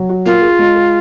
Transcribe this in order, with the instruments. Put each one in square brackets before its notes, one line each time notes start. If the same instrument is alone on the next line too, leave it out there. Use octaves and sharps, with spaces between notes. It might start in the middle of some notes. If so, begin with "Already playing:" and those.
Already playing: [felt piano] F#3
F#4
[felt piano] A#3 [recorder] F4
[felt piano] G#4
G#3
G#4